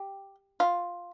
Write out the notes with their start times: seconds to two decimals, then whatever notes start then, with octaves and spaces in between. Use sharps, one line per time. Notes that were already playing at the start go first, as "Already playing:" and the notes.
Already playing: G4
0.60 F4